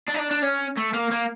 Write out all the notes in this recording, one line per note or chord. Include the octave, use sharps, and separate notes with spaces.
D4
D#4
D4
D4
C#4
A3
A#3
A#3